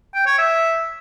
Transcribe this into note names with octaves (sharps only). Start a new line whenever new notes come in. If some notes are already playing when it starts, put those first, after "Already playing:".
G5
C#5
E5